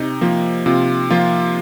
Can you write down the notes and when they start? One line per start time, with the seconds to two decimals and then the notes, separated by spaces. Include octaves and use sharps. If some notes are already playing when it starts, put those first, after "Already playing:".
Already playing: C3 D#4
0.21 F3 A#3
0.66 C3 F4
1.11 F3 A#3 F4